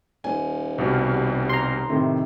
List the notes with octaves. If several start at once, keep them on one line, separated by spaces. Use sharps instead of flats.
D#1 G#5
C2 B2 G3
A#5 C6
A2 C3 D#3